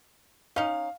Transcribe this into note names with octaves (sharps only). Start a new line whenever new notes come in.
C#4 D#4 F5